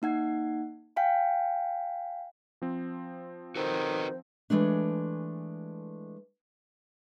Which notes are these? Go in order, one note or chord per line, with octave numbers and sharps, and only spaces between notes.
A#3 D#4 F#5 G#6
F5 G5 G#5
F3 C4
D#3 F#4 A4 B4 C5
E3 G#3 A3 D4